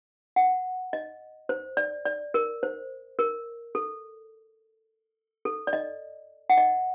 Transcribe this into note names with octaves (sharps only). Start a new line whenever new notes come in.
F#5
D#5
C5
D5
D5
A#4
C5
A#4
A4
A4
D5
D#5
F#5
D#5